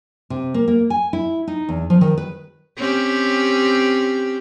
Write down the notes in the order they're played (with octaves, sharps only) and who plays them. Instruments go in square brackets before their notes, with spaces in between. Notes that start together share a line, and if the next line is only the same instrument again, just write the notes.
[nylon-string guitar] C3
A#3
A#3
G#5
E4
D#4
E2
F3
D#3
B4
[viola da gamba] C4 C#4 G4